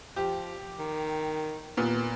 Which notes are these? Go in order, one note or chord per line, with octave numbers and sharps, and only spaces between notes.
F3 G4
D#3
D#2 A#2 B3